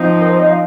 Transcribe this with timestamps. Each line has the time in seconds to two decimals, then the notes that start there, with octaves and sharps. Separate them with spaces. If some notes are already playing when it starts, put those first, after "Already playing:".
Already playing: F3 C4 D#4
0.20 A#4
0.29 C5
0.39 D#5
0.49 F5